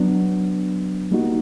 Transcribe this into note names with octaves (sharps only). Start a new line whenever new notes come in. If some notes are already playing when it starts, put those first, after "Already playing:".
Already playing: F#3 B3 D4
G3 A#3 D#4 F#4